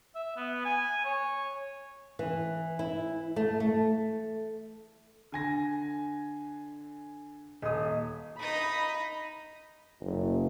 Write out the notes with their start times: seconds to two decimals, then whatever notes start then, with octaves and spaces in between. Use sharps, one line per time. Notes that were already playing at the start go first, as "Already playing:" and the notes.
0.15 E5
0.37 B3
0.65 G#5
1.05 C#5
2.19 E3
2.79 E4
3.36 A3
3.60 A3
5.32 D3 G#5 A#6
7.62 D#1 D#5 D#6
8.39 D#4 D#5 B5
10.00 F#1